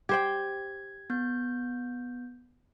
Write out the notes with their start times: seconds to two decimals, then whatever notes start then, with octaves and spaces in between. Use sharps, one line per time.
0.09 G4 C5 G5 G#6
1.10 B3 G6